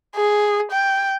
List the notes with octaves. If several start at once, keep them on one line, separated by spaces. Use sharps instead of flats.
G#4
G5